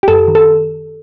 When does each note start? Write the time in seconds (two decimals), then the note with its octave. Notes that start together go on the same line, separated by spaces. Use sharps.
0.03 G4
0.08 F#2 A4
0.28 D#3
0.35 A4